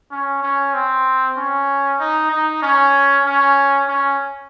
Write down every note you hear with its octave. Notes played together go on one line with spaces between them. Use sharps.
C#4
C#4
C4
C#4
D#4
D#4
C#4
C#4
C#4